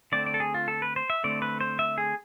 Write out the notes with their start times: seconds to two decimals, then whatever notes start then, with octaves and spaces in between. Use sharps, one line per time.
0.12 D3 A3 C4 D5
0.26 D5
0.34 A4
0.40 G#4
0.54 F4
0.68 A4
0.82 B4
0.96 C5
1.10 E5
1.24 D3 A3 C4 D5
1.42 B4
1.60 C5
1.79 E5
1.98 G#4